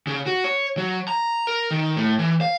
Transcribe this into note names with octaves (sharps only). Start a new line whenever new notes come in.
C#3
F#4
C#5
F#3
A#5
A#4
D#3
A2
E3
F5